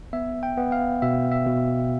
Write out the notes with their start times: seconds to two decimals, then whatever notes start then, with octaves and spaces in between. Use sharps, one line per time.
0.13 B3 E5
0.43 G5
0.57 B3
0.72 F5
1.02 B2 E5
1.32 E5
1.47 B2